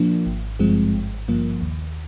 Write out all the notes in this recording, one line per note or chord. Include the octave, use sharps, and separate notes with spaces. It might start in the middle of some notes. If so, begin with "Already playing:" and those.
Already playing: A#2 F3 A#3 D4
G#1
G2 F3 G#3 C4
G#1
G2 F3 A#3
D#2